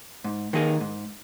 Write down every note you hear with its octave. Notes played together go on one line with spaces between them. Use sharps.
G#2
D#3 A#3 D#4 G#4
G#2